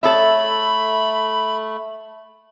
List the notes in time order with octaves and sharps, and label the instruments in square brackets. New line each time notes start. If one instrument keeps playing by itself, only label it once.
[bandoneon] A3 [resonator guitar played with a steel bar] A4 C#5 E5 [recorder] B5